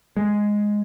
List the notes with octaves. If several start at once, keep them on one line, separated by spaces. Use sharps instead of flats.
G#3